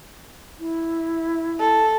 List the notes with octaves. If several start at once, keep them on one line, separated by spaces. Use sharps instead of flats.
E4
A4